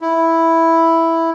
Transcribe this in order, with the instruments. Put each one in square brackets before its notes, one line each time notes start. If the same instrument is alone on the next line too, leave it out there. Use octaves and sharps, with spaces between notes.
[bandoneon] E4